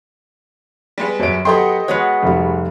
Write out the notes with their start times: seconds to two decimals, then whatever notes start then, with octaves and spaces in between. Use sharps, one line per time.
0.98 G3 G#3 B3
1.20 F#2 F#3 D7
1.45 F#3 B3 G4 A4 D#5 G5 C6 C7
1.88 G#3 B3 F#4 C#5
2.23 F1 G3